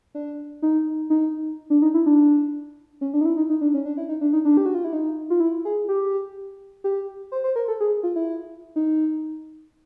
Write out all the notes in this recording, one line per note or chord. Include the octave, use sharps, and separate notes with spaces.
D4
D#4
D#4
D4
D#4
E4
D4
C#4
D4
D#4
E4
D#4
D#4
D4
C#4
D4
E4
D#4
D4
D#4
D4
G4
F#4
F4
E4
D#4
F4
E4
G#4
G4
G4
C5
C5
A#4
A4
G#4
F4
E4
D#4